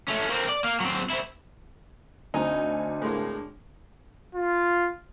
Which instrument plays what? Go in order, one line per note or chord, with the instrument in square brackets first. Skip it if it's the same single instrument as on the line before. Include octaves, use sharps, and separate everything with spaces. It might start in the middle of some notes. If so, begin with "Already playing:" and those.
[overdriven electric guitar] A3 C#4
A#3 C4
D5
A#3
F#3 C4
C4 E4
[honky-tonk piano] D2 C4 G#5 [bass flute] D4 [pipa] D#4
[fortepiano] A2 G#3 A#3
[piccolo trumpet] F4